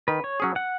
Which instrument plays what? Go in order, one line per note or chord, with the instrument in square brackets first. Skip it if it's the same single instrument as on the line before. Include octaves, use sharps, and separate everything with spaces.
[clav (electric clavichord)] D#3 [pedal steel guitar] B4
[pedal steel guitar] C#5
[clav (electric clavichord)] F#3 C#4 G#4
[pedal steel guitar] F#5